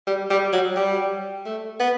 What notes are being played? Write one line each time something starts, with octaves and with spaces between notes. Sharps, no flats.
G3
G3
F#3
G3
A3
B3